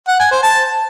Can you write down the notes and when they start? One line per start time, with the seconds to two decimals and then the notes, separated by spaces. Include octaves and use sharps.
0.08 F#5
0.20 G#5
0.31 C5
0.43 A5